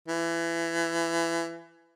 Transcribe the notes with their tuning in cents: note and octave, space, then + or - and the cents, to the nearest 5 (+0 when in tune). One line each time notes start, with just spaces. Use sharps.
E3 +25